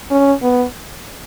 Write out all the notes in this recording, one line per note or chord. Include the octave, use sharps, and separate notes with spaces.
C#4
B3